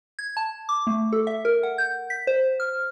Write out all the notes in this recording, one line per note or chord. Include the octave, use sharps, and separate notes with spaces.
G#6
A5
D6
A3
A4
E5
A#4
F#5
G6
B6
C5
F6